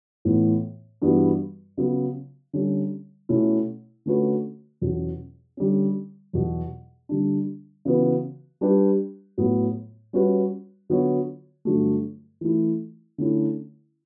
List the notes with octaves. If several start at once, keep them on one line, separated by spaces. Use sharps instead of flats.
A2 E3 B3
G2 E3 G3 B3 F#4
C#3 F#3 B3
D3 G3 C#4
B2 A3 C#4 E4
D3 A3 C#4 F#4 B4
E2 B2 F#3 C#4
D3 G3 C#4
E2 B2 F#3
D3 G3 D4
C#3 E3 B3 F#4 B4
G3 D4 G4 B4
A2 F#3 B3
G3 C#4 F#4 B4
D3 F#3 B3 F#4 C#5
G2 D3 F#3 A3
E3 A3 E4
D3 A3 C#4 E4